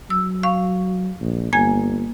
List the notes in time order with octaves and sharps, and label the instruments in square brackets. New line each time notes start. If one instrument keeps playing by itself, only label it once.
[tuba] F#3 [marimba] E6
[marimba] F5 C#6
[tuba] A#1
[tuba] G1 [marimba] A#3 G#5 G#6